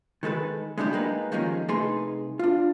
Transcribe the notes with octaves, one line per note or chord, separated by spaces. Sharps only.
D#3 G#3 A4 B4
G#3 A3 D4 E4 G4
G3 G#3 A#3 D#4 B4
D#3 F3 G3 G#3 A#3 C#4
C2 A3 D#4 G#4 B4 C6
D4 F4